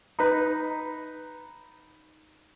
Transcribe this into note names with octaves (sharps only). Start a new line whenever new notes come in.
D#4 B4